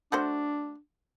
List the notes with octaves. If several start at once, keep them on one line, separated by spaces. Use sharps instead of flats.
A3 D4 F#4 C5